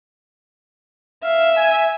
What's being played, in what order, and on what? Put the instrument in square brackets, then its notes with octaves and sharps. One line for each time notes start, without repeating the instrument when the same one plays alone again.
[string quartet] E5 [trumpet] F5
[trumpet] G#5